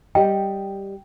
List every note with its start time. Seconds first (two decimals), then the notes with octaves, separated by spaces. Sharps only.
0.15 G3 G4 D#5 G5